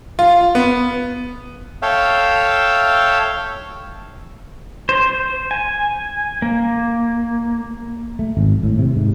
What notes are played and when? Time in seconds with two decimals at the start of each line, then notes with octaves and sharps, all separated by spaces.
0.19 F4
0.55 B3
1.82 A4 C#5 E5 F5 G5
4.89 C5
5.51 G#5
6.42 A#3
8.19 A3
8.37 G#1
8.64 A2
8.79 C3
8.96 G#2